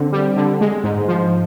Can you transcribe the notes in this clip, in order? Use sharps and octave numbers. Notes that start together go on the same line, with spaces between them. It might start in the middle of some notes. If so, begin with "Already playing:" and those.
Already playing: D3 C4
G3
D3
G#3
G#2
F3